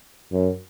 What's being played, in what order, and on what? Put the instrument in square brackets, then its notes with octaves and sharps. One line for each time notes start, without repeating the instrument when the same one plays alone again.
[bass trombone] F#2